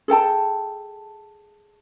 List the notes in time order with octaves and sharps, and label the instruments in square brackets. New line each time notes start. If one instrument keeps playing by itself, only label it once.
[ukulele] G#4 A4 G5 A5